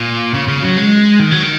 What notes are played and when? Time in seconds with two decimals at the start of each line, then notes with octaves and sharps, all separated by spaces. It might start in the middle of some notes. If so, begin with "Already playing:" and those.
Already playing: A#2
0.34 C#3
0.48 C#3
0.62 F#3
0.77 G#3
1.19 D#3
1.31 F#3
1.42 D#3